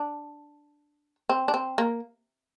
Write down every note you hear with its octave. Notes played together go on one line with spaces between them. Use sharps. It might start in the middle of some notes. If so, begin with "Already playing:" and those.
Already playing: D4
C4
D4
C4
A#3